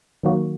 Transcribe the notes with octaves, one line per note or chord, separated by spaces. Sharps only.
D#3 F#3 A#3 F#4